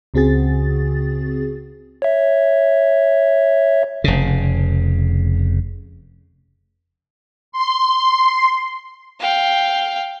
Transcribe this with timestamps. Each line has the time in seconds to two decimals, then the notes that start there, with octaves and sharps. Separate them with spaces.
0.14 C#2 C#3 C4 F#4 G#4 A6
2.02 C#5 E5
4.04 F1 C#3
7.52 C6
9.20 F5 G5